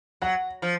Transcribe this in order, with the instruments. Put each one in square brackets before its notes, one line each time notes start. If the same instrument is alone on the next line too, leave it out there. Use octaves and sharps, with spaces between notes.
[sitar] F#3 [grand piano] F#5
[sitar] F3